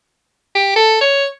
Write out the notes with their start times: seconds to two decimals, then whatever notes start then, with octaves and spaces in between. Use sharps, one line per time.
0.55 G4
0.76 A4
1.01 C#5